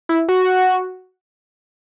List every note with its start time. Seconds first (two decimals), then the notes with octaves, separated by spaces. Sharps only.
0.09 E4
0.29 F#4